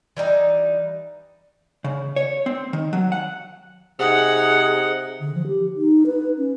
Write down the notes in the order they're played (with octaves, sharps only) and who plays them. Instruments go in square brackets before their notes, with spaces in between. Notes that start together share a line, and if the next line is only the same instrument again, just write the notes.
[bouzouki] E3 G3 D#4
[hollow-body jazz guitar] C#3
C#5
C4
D#3
F#3
F#5
[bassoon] C3 [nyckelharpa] D#4 F#5 [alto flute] G#4
[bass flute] D3
F3
G4
D#4
B4
C#4